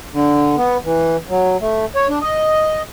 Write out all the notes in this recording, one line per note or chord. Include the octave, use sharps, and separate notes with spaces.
D3
B3
E3
F#3
A3
C#5
D4
D#5